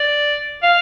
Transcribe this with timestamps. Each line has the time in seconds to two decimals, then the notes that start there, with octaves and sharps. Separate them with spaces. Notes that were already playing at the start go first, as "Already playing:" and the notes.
Already playing: D5
0.63 F5